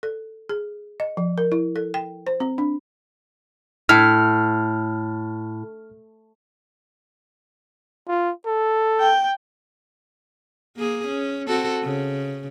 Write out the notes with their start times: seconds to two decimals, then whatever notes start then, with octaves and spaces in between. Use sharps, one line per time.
0.03 A4
0.49 G#4
1.00 D#5
1.17 F3
1.38 A#4
1.52 E4
1.76 A4
1.94 G5
2.27 C5
2.40 C4
2.58 D4
3.89 A2 F6
8.08 F4
8.46 A4
9.00 G5
10.77 A#3 G#4
11.07 C#4
11.48 C4 F#4 A4
11.83 C#3